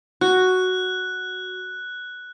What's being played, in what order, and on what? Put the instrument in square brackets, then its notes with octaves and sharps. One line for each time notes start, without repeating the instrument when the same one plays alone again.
[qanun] F#4 [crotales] F#6